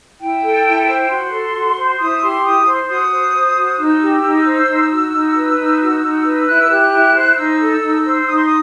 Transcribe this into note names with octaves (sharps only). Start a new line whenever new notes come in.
E4 G5
A4
E4
C5
F#4 C6
A4
F#4
C5
E4 D#6
G4 C6
E4 D#6
C5 C6
F#4 D#6
C5
C5
F#4
D#4 E6
G4
D#4
C5
D#4
F#4
D#4
B4
D#4
F#4
D#4
B4
E4 F#6
E6
G4 F#6
E4
C5
D#4 E6
A4
D#4
C5
D#4 D#6
C6
D#6